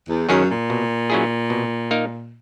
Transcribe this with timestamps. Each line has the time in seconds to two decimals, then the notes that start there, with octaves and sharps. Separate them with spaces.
0.09 E2
0.29 F#2 D#3 F#3 C#4 G#4
0.49 A#2
0.70 B2
1.10 F#3 C#4 E4 G#4
1.50 B2
1.91 A#3 D#4 A#4